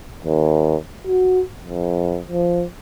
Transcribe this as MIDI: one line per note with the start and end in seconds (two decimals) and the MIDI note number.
0.25 0.76 39
1.07 1.42 66
1.65 2.20 41
2.29 2.64 53